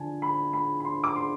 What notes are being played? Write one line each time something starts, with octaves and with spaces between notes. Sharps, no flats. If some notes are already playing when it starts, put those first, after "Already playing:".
Already playing: D3 F3 G#5 A5
B5
B5
B5
C6
D6
C6